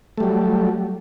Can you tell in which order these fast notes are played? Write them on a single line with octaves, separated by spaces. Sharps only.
A3 G3 F#3